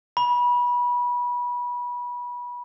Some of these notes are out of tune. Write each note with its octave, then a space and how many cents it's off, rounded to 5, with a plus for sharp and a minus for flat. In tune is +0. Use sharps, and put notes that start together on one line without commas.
B5 -25